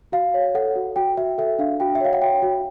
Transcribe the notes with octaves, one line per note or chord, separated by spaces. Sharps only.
F#4 F5
C#5
A4 F#5
F#4
F#4 G5
F#4 E5
A4 E5
D4 F5
F#4 G5
E5
C#5 F5
F#5
F#4 G5
F#4